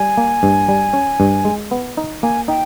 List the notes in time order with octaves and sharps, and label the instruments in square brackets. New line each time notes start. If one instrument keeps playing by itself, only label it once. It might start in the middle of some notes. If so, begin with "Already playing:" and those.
Already playing: [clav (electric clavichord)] G3 [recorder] G#5
[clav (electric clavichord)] A#3
G2
G3
C#4
G2
G#3
B3
D#4
[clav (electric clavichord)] A#3 [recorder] G#5
[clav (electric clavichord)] D#4 [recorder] G5